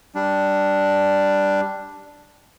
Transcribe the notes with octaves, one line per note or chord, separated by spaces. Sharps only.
G3 D4